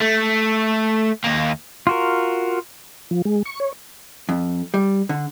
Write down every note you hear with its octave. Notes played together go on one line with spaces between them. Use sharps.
A3
D#2 A#3
F4 F#4 A#4
F3
G#3
C#6
C#5
F2
G3
D3